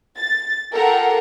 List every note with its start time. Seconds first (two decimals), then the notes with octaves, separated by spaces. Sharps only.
0.17 A6
0.74 F4 G4 A4 A#4 F#5